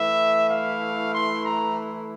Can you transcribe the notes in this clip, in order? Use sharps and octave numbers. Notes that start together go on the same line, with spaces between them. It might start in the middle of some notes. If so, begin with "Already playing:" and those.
Already playing: E3 A3 E4 E5
F5
C6
A#5